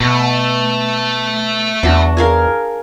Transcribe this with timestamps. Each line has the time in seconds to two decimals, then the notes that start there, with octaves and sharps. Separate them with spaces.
0.01 B2 A3
1.83 E2 D4 F#4
2.17 G#4 A#4 F5